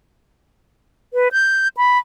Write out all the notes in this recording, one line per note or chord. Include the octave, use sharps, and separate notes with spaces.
B4
G6
B5